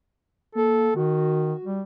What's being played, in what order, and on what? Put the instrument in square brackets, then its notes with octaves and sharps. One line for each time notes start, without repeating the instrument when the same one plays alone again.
[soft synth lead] A#3 [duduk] A4
[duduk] D#3 [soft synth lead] F#4
[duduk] G3